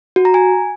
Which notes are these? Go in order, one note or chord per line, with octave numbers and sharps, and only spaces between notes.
F#4
A#5
G#5